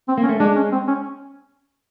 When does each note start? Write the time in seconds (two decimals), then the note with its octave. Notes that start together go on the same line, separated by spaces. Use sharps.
0.08 C4
0.18 A#3
0.23 C#4
0.29 A3
0.40 G#3 D4
0.56 C#4
0.72 C4
0.88 C#4